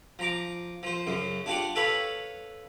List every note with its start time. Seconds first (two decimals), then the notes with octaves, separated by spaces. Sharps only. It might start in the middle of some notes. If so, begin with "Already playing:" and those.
0.19 F3 A#5 D6
0.83 F3 C5
1.07 F#2 C#3
1.46 D4 F4 G4 D5 F#5
1.76 A4 B4 C#5 F5 A5 B5